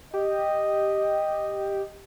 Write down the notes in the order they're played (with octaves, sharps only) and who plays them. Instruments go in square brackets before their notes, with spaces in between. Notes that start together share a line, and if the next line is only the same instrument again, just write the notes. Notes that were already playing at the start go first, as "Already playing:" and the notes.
[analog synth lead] G4 [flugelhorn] D#5